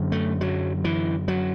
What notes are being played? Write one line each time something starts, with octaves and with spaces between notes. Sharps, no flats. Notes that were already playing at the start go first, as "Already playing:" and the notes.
Already playing: F#2 D3
A3
F#3
E3
F#3